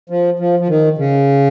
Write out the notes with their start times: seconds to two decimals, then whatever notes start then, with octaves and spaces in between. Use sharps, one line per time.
0.10 F3
0.39 F3
0.59 F3
0.68 D#3
0.98 C#3